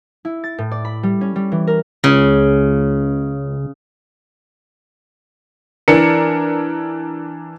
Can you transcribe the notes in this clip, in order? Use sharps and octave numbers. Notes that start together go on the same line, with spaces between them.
E4
A6
A2
D5
B5
G3
C#4
G3
E3
A#4
C#2 C#3
E3 D4 A#4 C#7